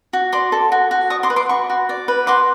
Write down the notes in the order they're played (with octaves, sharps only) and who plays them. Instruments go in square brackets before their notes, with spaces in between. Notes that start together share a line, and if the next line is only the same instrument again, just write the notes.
[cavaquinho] F#4
D5 C6 D6
A4
F#4
F#4
D5 C#6 D#6
C6 D6
B4
C6 D6
F#4 B5 C#6
F#4
D5
B4
F#4 C6 D6